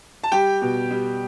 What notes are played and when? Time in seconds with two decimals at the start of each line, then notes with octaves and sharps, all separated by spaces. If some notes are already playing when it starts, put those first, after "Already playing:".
0.24 A5
0.32 G3 G4 G5
0.62 B2
0.91 G3